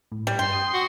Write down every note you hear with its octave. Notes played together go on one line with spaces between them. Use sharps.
A2
G3
G2 G5 C6
D#6
F#4